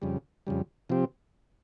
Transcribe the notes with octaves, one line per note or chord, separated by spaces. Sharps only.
F2 C#3 G3
F2 C#3 G3
C3 F3 C4 G4